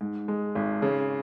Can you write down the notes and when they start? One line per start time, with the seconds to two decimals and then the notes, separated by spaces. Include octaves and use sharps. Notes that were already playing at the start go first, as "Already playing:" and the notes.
0.01 G#2
0.28 G#3
0.55 G#1
0.82 C#3